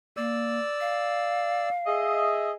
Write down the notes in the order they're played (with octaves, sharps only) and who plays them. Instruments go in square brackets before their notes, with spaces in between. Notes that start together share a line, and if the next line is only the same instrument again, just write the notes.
[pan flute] A#3 [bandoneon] D5 E6
[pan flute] F5
[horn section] G#4 D#5 E5